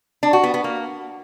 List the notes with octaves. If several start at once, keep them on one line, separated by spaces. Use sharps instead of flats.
D4
F#4
B3
B3
A#3